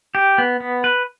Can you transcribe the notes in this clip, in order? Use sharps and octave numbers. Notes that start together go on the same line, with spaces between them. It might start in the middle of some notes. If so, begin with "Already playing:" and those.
G4
B3
B3
B4